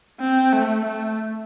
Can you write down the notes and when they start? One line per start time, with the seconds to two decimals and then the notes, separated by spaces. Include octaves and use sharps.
0.20 C4
0.53 A3
0.86 A3